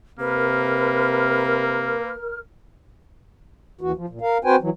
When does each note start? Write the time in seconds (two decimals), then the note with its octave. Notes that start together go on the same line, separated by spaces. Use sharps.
0.19 C3 A#3 A#4 B4 F6
3.81 D#2 E3 F#4
3.96 F3
4.09 A#2
4.21 A#4 F5
4.45 C4 F#4 B4 C5 G5 G#5
4.61 E3 F#3